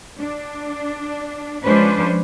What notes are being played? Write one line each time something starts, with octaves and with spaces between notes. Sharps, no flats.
D4
F3 G#3 C#4 D4 B4 C5